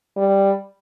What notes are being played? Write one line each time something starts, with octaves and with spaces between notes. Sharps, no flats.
G3